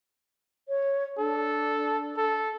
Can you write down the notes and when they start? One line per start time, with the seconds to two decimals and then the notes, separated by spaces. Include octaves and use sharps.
0.68 C#5
1.18 D4 A4
2.17 A4